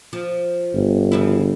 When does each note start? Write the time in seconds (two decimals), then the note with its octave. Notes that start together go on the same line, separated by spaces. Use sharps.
0.13 F3
0.74 G1
1.12 C#3 F3 E4